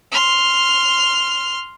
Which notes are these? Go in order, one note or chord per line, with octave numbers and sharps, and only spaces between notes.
C6 F6